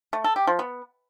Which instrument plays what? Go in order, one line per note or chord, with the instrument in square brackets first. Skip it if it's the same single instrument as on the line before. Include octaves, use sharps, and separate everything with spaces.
[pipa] A3
A4
G4
F3
B3